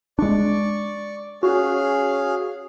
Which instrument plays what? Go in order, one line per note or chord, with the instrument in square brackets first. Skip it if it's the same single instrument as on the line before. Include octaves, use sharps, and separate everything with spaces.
[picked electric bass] G#3 D4 [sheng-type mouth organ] D5 C#6
[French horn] C#4 [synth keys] F#4 [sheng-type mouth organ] G#4 F5